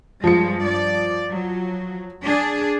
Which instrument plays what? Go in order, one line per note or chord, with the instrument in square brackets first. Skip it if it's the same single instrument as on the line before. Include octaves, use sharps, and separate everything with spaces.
[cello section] G2 G#3 [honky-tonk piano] F3 C#7
[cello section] D5
F#3
D4 G#4